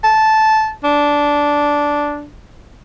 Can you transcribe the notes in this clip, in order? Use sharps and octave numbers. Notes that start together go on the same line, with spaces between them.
A5
D4